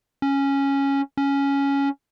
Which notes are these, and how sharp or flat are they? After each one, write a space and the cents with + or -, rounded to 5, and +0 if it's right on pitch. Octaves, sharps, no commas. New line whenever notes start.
C#4 -5
C#4 +5